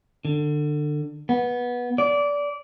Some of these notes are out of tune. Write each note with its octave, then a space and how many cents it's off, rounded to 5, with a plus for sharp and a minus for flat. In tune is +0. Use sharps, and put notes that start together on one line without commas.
D3 +25
B3 -15
D5 -20